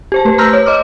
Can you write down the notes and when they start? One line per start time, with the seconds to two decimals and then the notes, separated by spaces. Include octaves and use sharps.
0.12 G4 C5 A5
0.25 A3 B4
0.38 A#5 C6 E6 F6 G6 A#6
0.53 C#5
0.66 D#5 C6 D6 F6